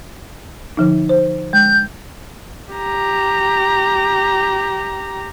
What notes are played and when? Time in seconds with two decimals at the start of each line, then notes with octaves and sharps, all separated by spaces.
0.77 D3 F3 D#4
1.09 C5
1.53 G#3 G6
2.72 G4 A#5